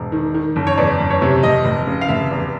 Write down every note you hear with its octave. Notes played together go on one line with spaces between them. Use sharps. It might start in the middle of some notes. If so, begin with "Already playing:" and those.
Already playing: E1
D#3
D#3
F#1
C#5
E2 D5
F#1
C#5
C3
F1 D#5
F1
C#3
F5
F1 E5
E2